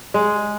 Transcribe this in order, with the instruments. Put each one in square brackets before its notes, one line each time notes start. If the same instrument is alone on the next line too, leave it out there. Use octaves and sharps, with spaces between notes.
[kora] G#3